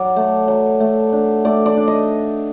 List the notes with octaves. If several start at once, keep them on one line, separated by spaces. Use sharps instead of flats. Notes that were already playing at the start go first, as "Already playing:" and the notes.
Already playing: F#3 D5
A3
F#3
A3
D4
A3 D5
D5
D4
D#5